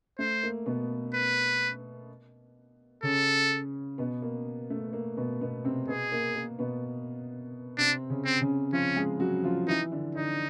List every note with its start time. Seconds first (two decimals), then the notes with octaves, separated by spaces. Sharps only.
0.19 A3 C5
0.43 A#3
0.66 B2 B3
1.14 B4
3.03 C#3 C#4 A4
3.98 B2 B3
4.22 A#3
4.70 A3
4.93 A#3
5.17 B2 B3
5.40 B2 B3
5.65 C3 C4
5.88 B2 B3 G#4
6.12 A#3
6.35 A#3
6.59 B2 B3
7.78 C3 C4 D4
8.10 C#3 C#4
8.25 C4
8.41 C#3 C#4
8.72 F3 C#4 F4
8.96 G#3 G#4
9.20 F#3 F#4
9.44 F3 F4
9.67 E3 D#4 E4
9.92 D3 D4
10.15 D3 D4 D#4